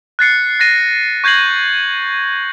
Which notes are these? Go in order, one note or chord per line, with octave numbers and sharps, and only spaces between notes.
F#6 A6 C7 C#7
F#6 A6 A#6 D#7
C#6 G6 G#6 A#6 C7 F#7